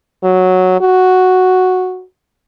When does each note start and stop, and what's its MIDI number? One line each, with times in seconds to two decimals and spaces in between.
0.24 0.76 54
0.81 2.03 66